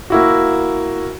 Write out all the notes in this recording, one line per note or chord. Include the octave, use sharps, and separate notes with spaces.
A#3 E4 F#4